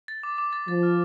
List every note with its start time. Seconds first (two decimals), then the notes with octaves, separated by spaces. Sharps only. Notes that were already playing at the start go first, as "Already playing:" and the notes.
0.08 A6
0.23 D6
0.38 D6
0.53 A6
0.68 F3 A6
0.83 F6